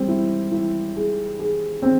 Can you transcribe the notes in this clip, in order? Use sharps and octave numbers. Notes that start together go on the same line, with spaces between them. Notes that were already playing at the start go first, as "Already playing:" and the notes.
Already playing: G3 C4
E4
E4
G#4
G#4
C4